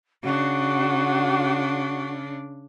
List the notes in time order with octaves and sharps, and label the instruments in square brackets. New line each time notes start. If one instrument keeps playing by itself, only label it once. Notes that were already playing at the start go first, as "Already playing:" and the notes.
[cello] C#3 D4 [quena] F#4